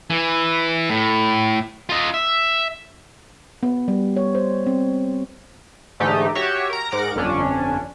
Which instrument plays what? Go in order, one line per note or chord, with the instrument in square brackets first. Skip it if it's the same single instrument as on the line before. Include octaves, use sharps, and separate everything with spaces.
[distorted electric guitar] E3
A2
F4 D#5
E5
[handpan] B3
G3
C#5
C5
C4
[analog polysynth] G#2 D3 E3 A3 D#4 G4
F#4 G4 C#5 E5 C#6
A#4 A#5
G#2 A#4 F#5 D6 A#6 D7
G1 F2 C#4 D4